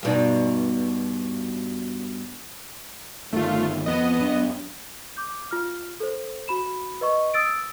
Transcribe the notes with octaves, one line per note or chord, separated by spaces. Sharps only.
G2 B2 D#4
G1 D#3 A3 F4
F2 B3 D#5
F#2 D4
D6 G6
F4 F6
A4 C5
F#4 B5 E7
B4 D#5 C#6
D#6 E6 A6 D7